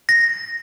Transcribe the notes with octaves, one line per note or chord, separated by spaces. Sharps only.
A#6